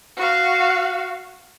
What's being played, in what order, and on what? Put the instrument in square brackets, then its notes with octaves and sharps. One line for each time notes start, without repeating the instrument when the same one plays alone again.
[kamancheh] F#4 F5